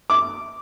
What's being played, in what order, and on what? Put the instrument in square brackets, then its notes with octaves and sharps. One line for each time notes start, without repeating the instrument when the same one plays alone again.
[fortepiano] D6